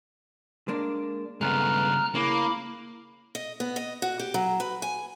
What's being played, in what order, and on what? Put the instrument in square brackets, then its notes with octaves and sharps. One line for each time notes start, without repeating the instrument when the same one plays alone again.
[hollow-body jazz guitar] G#3 A#3 D4
[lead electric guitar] G2 C#3 [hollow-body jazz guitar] G#3 A3 B3 [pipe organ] A#5 F6 F#6
[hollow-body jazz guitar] C#3 [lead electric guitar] A#3 [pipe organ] E4 B5 D6
[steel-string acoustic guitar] D#5
B3
D#5
F#4
G4
F#3
B4
G#5